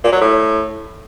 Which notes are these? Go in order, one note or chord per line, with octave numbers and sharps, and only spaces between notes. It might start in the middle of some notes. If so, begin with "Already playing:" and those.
A#2
F#3
A2